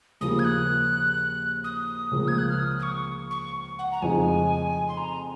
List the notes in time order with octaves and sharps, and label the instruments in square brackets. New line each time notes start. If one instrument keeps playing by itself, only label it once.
[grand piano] D#2 C#3 F3 A#3 [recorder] D#6
[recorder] G#6
F#6
D#6
[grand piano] C#2 C#3 F3 A#3
[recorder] G#6
F#6
F6
D#6
D#6
C#6
C#6
F#5
A#5
[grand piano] F2 C#3 F3 G#3 D#4 [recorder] G#5
[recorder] C6
A#5